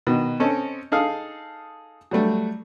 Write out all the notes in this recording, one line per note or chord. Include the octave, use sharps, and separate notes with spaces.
B2 D#3
C4 C#4 A4 D#5
D#4 G#4 A4 F5
F#3 G3 A3